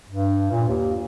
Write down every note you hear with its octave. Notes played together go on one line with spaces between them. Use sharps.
G2
A#2
D#2